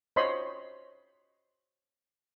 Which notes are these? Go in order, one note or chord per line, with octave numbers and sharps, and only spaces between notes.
C5 C#5 D#5 B5 C6